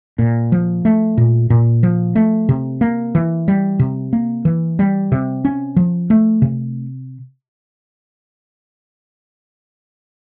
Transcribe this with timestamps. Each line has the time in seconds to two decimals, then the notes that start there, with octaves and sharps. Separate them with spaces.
0.19 A#2
0.52 F3
0.85 A3
1.18 A#2
1.50 A#2
1.83 F3
2.15 A3
2.49 C3
2.81 A#3
3.15 E3
3.48 G3
3.79 C3
4.13 A#3
4.45 E3
4.79 G3
5.12 C3
5.45 C#4
5.76 F3
6.10 A3
6.42 C3